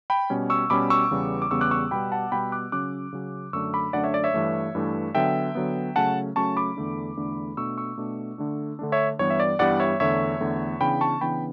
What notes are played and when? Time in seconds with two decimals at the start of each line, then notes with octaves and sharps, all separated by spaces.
0.10 G5 B5
0.30 B2 G3 C#4
0.50 C#6 E6
0.70 B2 G3 C#4 B5 D6
0.90 C#6 E6
1.11 E2 C#3 G3 B3
1.42 D6
1.51 E2 C#3 G3 B3 C#6 E6
1.61 D6 F#6
1.71 C#6 E6
1.91 B2 G3 B3 G5 B5
2.12 F#5 A5
2.32 B2 G3 B3 G5 B5
2.52 D6 F#6
2.72 C#3 F#3 C#4 D6 F#6
3.13 C#3 F#3 C#4
3.53 F#2 D3 A3 D4 C#6 E6
3.74 B5 D6
3.93 F#2 D3 A3 D4 D5 F#5
4.04 C#5 E5
4.14 D5
4.24 C#5 E5
4.34 G2 E3 A3
4.75 G2 E3 A3
5.15 D3 F#3 B3 E5 G5
5.55 D3 F#3 B3
5.96 C#3 F#3 A3 C#4 F#5 A5
6.36 C#3 F#3 A3 C#4 A5 C#6
6.57 B5 D6
6.77 E2 D3 A3 D4
7.17 E2 D3 A3 D4
7.57 B2 A3 D4 C#6 E6
7.78 C#6 E6
7.97 B2 A3 D4
8.38 D3 A3 D4
8.79 D3 A3 D4
8.92 C#5 E5
9.19 G2 E3 G3 B3 C#5
9.30 E5
9.40 D5
9.59 G2 E3 G3 B3 D5 F#5
9.80 C#5 E5
10.00 E2 D3 A3 C#5 E5
10.40 E2 D3 A3
10.80 C#3 E3 B3 D4 G5 B5
11.01 A5 C#6
11.21 C#3 E3 B3 D4 G5 B5